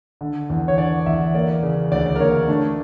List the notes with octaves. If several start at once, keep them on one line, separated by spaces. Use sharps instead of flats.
D3
E2
C#5
D3 D5
E2 E5
A#3 D5
C#3
D2 D5
D5
A#4
A#3 C#5
A3 D4